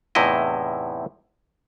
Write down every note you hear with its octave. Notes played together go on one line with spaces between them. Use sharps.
E2 A2 C3 D#4 E4 D#5